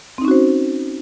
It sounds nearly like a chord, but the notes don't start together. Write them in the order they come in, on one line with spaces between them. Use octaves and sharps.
C4 D#4 C#4 F#4 C5